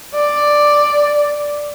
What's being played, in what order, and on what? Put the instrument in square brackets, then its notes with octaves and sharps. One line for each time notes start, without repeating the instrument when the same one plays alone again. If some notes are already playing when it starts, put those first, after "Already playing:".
[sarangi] D5